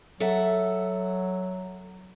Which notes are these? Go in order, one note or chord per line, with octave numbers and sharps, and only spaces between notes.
F#3 A4 E5 F#5